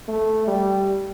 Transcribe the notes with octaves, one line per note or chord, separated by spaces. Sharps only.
A3
G3